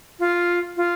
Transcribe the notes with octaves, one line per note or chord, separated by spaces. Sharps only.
F4
F4